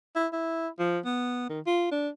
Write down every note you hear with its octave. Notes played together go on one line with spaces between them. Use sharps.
E4
E4
F3
B3
D#3
F4
D4